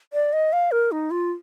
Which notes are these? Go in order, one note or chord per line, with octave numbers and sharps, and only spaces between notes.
D5
D#5
F5
A#4
D#4
F4